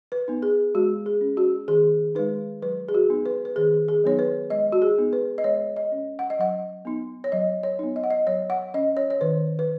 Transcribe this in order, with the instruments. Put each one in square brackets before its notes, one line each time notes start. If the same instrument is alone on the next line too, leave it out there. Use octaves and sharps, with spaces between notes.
[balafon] B4
B3 D#4
G#4
G#3 F#4
G#4
C#4
F#4
D#3 G#4
G#3 D#4 B4
F#3 B4
G#4
F#4
B3 D#4
B4
B4
D#3 G#4
G#4
F#3 B3 D#4 C#5
B4
G#3 D#5
F#4
G#4
B3 D#4
B4
D#5
G#3 C#5
D#5
C#4
F#5
D#5
F#3 F#5
B3 D#4
C#5
F#3 D#5
C#5
B3 D#4
D#5
F#5
D#5
F#3 C#5
F#5
C#4 D#5
C#5
C#5
D#3 B4
B4